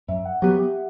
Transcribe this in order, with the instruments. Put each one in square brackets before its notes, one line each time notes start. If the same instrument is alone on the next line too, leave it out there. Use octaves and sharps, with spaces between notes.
[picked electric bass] F#2 [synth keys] E5
[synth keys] F#5
[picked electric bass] F#3 B3 [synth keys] G4
[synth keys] G4